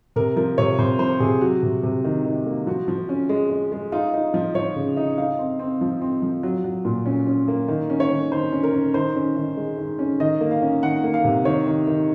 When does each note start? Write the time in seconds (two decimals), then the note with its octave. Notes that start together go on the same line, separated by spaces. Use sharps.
0.16 C3 A#4
0.36 F3 A#4
0.58 C3 C#5
0.79 C3 C5
0.99 F3 C5
1.20 C3 G#4
1.41 F#3 F#4
1.63 C3
1.83 C3
2.04 D#3
2.25 D#3
2.46 A#3
2.67 F3 F#4
2.88 F3
3.09 C#4
3.29 G#3
3.50 G#3
3.72 G#3
3.92 D#4 F4
4.14 D#4
4.34 F3
4.55 F3 C#5
4.76 C#3
4.97 D#4
5.18 D#4 F5
5.39 C4
5.59 C4
5.81 F3
6.02 C4
6.22 F3
6.43 F#3
6.64 F#3
6.85 A#2
7.06 C#4
7.27 C#4
7.48 A#3
7.68 D#3
7.90 C#4
8.00 C#5
8.11 D#3
8.32 D#3 C5
8.52 C#4
8.63 A#4
8.73 C#4
8.94 D#3 C5
9.15 C#4
9.37 D#3
9.57 G#3
9.78 D#3
9.99 C#4
10.20 D#3 D#5
10.41 A#3
10.51 F5
10.62 C#4
10.83 D#3 F#5
11.04 A#3
11.14 F5
11.24 C3
11.45 D#3 C#5
11.67 D#3
11.87 D#3